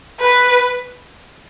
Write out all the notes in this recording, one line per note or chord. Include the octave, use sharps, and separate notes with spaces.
B4